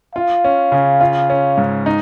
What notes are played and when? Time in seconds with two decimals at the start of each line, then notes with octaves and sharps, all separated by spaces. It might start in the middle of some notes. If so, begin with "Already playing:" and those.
0.15 F4 F5
0.44 C#4
0.72 C#3
1.01 F4
1.30 C#4
1.57 G#2
1.86 D#4